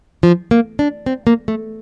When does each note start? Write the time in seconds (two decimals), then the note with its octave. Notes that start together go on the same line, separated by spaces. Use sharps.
0.23 F3
0.51 A#3
0.79 D4
1.06 C4
1.27 A#3
1.48 A3